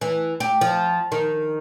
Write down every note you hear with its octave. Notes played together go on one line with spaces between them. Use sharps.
E3
G4
F3
D#3